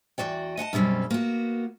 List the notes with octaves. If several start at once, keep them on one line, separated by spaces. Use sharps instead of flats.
E2 E3 F#4 D5 G5
D#5 F#5 G#5 A5
F#2 B2 G3 C4 C#4
A#3 B3 F#4